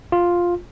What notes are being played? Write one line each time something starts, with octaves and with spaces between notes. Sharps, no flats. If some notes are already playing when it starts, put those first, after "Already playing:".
F4